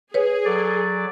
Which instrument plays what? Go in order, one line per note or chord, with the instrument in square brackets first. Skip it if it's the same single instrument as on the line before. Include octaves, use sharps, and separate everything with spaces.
[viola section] G#4 [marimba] B4 C#5
[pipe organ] F#3 D5 [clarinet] A4